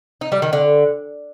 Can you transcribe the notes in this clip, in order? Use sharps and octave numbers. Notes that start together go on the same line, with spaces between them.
D#4
G3
D#3
D3